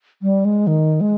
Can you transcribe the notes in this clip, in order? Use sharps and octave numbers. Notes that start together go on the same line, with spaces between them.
G3
G#3
D#3
G#3